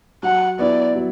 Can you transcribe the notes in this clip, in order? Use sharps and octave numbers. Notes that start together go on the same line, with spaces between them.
F#3 F#5
B3 E4 D5
F#3